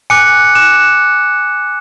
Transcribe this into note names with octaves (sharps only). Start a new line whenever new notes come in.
G#5 D6 F#6 C#7
G#5 D6 F#6 E7